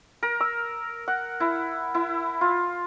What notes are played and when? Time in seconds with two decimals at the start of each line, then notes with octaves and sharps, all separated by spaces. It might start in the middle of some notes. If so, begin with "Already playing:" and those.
0.23 A#4
0.41 E6
1.08 F#5
1.40 E4
1.94 E4
2.41 F4